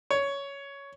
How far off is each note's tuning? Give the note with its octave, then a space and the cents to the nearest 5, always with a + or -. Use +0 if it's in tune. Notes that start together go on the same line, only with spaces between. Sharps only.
C#5 +10